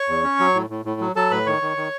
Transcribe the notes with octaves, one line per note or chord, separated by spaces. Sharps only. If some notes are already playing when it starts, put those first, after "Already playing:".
Already playing: C#5 C#6
E2
C#4
F#3
A2
A2
A2
F#3
F#3 A4 A5
A2 B4 B5
D#3 C#5 C#6
D#3
D#3